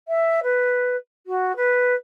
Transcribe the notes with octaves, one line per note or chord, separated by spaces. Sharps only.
E5
B4
F#4
B4